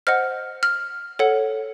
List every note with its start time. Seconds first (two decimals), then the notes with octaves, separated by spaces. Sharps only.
0.07 C5 D#5 F#5 F6
0.63 F6
1.19 A4 C#5 F#5